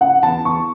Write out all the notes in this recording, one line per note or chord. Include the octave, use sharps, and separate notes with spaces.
C#3 F#5
E2 A5
E2 C#6